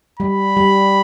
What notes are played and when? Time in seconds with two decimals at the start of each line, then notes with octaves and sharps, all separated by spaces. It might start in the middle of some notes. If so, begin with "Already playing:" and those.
0.19 G3 B5
0.57 G3